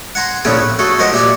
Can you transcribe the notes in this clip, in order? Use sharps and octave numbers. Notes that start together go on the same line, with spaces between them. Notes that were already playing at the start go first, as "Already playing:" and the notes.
F#5 G#5 A#5 C6
A#1 A2 C#3 B3 G#4 G5
B4
A3 F#4 G#4 A4
F3 G#3 A#4 C5 D#5 F#5
A#2 G4 D5 E5 G#5